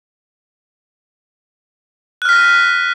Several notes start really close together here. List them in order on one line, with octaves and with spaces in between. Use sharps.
F#6 F6 B6 A#6 D#7